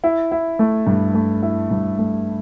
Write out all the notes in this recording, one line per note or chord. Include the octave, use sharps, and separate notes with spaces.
E4
E4
A3
G2
A3
E4
G2
A3